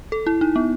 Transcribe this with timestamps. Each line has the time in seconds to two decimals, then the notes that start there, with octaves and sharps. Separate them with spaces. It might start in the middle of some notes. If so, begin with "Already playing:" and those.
0.12 A4
0.27 E4
0.41 D#4
0.56 B3